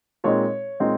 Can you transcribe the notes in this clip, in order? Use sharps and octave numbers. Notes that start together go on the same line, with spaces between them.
A#2 G#3 C4 D#4 C#5
A#2 G#3 C4 D#4